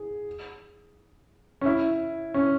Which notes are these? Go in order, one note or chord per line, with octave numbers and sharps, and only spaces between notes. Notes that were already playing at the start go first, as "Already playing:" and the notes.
Already playing: G#4
C#4
E4
C#4